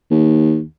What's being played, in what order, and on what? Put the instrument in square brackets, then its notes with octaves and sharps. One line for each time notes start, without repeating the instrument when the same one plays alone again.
[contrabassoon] D#2